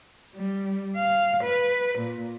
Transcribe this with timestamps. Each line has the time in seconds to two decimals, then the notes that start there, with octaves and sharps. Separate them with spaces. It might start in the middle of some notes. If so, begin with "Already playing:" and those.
0.35 G3
0.96 F5
1.43 B4
1.98 A#2